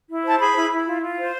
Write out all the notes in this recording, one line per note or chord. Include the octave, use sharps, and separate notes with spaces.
E4
C5 A5
G#4 B5
E4
E4
F4
F4
C5